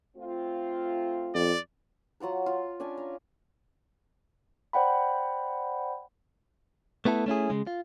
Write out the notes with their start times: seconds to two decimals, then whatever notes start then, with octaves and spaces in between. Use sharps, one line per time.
0.17 A3 C4 F4
1.35 F2 D5
2.20 F#3 F4 F#5 A#5
2.46 F4
2.80 C#4 D4 G#5
2.97 A#5
4.73 C5 D5 F#5 G5 B5
7.05 A3 B3 E4 A4
7.26 A3 C#4 E4 G#4
7.50 C#3 G#3
7.67 F4